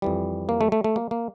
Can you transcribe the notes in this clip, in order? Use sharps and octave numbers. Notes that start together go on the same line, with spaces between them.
F2 E3 G3
A#3
A3
A3
A3
A#3
A#3